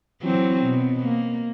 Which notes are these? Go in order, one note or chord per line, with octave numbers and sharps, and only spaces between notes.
E3 F#3 C4
B2
A#3